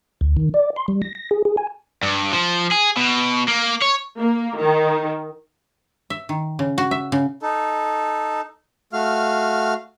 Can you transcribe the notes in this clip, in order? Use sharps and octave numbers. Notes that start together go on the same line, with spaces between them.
D2
D#3
D5
C6
G3
A#6
A#6
G#4
G#4
G#5
G2
F3
G#4
B2
A#3
C#5
A#3
D#3
E5
D#3
C#3
F#4
E5
C#3
D#4 A4
A3 F#4 F5 F6